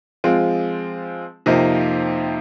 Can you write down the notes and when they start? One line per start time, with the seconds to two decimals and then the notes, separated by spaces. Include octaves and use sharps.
0.24 F3 G#3 C4 F4
1.46 F2 C3 F3 A#3 D#4